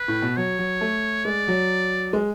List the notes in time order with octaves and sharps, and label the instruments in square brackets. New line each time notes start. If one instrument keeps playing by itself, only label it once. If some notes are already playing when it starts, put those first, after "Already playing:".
Already playing: [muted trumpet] B4
[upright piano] A2
B2
[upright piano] F#3 [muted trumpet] C#5
[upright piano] F#3
A3
[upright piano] G#3 [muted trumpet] D5
[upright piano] F#3
G#3